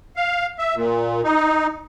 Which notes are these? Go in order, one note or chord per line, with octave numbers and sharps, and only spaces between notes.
F5
E5
A#2
D#4